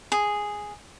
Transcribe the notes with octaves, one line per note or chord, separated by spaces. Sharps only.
G#4